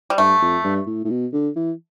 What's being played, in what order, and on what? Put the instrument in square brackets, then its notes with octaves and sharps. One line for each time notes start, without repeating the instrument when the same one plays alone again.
[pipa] G3
[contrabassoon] G2 [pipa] A3
[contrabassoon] F2
G2
A2
A2
B2
D3
E3